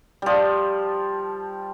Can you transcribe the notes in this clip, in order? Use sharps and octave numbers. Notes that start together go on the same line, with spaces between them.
F3 G3